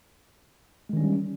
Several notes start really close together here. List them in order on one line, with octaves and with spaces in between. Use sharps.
G#3 D#3 C#4 G3